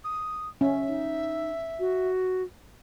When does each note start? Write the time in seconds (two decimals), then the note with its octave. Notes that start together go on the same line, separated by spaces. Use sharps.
0.04 D#6
0.61 C#4 E5
0.88 D#4
1.79 F#4